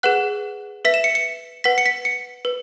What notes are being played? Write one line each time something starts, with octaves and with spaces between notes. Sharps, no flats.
G#4 B4 F#5 F#6
B4 E5 B6
E7
C#7
C#7
B4 F#5 B6
C#7
B6
C#7
B4